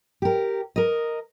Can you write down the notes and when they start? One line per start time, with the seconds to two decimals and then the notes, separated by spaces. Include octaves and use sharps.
0.22 G4 A#4
0.76 A#4 D#5